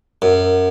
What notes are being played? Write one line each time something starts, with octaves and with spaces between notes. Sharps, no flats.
F#2